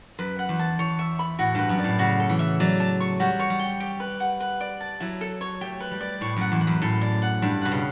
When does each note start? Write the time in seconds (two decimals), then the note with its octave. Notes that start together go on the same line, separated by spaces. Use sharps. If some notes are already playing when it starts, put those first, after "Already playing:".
0.19 F#2 B4
0.39 F#5
0.49 E2
0.59 A5
0.79 E2 C#5
0.99 E5
1.19 B5
1.39 A2 F#4
1.55 G2 B4
1.69 F#2
1.79 D5
1.84 A2
1.99 C#3 F#4
2.20 A4
2.29 E3
2.39 E5
2.60 F#3 D5
2.80 A5
3.00 C#6
3.19 G3 F#4
3.39 C#5
3.50 G3
3.60 G5
3.80 G4
4.00 B4
4.20 F#5
4.40 B4
4.60 D5
4.81 A5
5.00 F#3 E4
5.21 A4
5.41 C#5
5.61 A3 G4
5.80 B4
5.91 G3
6.01 D5
6.21 A2 C#5
6.37 F#2 F#5
6.52 E2
6.61 B5
6.67 F#2
6.82 A2 A4
7.01 D5
7.22 F#5
7.42 G2 D5
7.62 B2 F#5
7.72 C#3